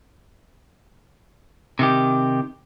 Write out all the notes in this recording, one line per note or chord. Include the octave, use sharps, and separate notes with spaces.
C3 D#3 G4